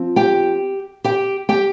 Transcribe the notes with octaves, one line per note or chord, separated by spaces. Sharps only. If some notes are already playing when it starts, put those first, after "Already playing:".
Already playing: F3 C4
G4 G5
G4 G5
G4 G5